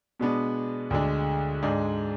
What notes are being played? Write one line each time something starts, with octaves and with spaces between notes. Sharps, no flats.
B2 G#3 B3 D4
D2 D3 G#3 D4
G#2 G#3 D4